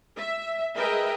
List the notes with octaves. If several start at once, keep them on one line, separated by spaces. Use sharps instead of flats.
E5
G#4 A#4 B4 D#5 E5 G5